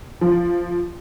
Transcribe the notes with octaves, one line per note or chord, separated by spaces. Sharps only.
F3